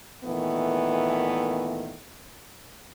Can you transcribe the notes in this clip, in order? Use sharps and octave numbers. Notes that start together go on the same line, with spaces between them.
A#2 D#3 E3 A3 B3